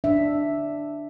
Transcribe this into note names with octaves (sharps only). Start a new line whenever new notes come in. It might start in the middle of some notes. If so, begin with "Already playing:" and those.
D4 E5